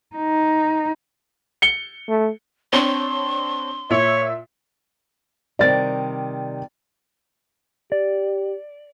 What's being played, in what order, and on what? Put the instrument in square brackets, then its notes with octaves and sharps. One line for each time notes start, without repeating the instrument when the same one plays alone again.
[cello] D#4
[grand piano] C#7 G7
[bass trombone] A3
[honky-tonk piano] C4 D4 C#5 [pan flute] C6
[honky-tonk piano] A#2 E5 [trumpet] C#5
[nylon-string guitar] C3 D#3 G3 [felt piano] D5 A6
[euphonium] G4 [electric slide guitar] D5